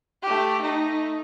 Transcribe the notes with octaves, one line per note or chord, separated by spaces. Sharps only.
A3 G4
A3 D#4